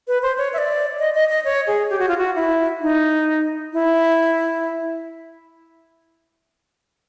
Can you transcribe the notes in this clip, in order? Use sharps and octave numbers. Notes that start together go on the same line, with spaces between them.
B4
C5
C#5
E5
D5
D#5
D#5
D#5
C#5
G#4
G4
F#4
F4
F#4
E4
D#4
E4